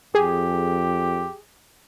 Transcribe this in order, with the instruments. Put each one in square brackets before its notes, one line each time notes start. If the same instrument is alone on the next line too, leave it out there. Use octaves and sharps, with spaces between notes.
[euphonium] F2 [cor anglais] G4 [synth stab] G#4